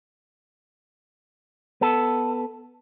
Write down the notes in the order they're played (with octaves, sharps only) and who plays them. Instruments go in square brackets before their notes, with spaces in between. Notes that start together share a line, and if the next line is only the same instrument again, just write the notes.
[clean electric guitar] B3 A4